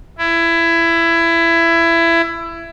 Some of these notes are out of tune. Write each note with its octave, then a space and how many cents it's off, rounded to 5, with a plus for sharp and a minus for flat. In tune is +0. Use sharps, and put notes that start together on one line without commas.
E4 +20